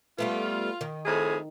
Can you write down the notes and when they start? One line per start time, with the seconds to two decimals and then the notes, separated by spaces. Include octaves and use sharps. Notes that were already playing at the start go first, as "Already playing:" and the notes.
0.18 G3 A3 B3 F4
0.81 D#3
1.05 F2 A2 G#4